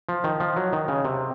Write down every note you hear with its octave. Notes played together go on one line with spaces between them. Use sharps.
F3
D#3
F3
F#3
D#3
C#3
C3